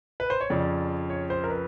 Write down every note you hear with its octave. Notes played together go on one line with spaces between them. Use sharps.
B4
C5
C#5
F2 C#3 F3 D5
C#5
C5
A#4
B4